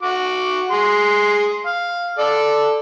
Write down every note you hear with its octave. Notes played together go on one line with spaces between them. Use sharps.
F#4 D6
G#4 C6
F5
A4 D5